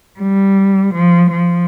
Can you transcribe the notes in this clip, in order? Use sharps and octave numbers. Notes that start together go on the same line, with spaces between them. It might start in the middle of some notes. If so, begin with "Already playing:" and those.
G3
F3
F3